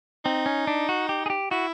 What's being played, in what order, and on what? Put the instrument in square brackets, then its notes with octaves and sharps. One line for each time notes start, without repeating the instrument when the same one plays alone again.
[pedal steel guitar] C4 [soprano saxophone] D#4
[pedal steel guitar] C#4
D4
F#4
G4
G#4
G4
[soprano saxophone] E4 [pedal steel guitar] F#4